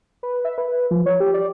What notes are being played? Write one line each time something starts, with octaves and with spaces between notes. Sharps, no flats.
B4
E5
B4
F3
C#5
G4
D5